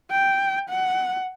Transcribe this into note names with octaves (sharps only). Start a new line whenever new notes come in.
G5
F#5